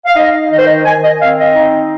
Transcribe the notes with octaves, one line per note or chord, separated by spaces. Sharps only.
F5
D#4 D#5
D#3 D#5
C5
D#5
D#3 G#5
D#5
C4 F5
D#5
D#4